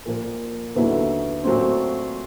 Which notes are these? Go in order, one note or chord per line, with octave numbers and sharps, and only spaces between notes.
A#2 F3 A#3
D#2 D3 F#3 B3 E4
A#2 F#3 A3 C4